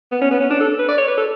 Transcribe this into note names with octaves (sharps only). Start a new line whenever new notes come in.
B3
C#4
B3
C#4
D4
A4
B4
D5
C#5
B4
A4